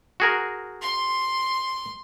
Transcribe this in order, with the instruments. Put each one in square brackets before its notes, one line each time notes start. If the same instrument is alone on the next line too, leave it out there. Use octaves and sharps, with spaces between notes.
[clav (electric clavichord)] F#4 G#4 A#4
[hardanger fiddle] C6